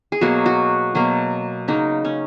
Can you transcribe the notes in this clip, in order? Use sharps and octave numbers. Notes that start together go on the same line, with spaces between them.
G#4
B2 F#3 A#3 F#4
F#4
B2 F#3 A#3
C#3 F#3 A#3 D#4
C#4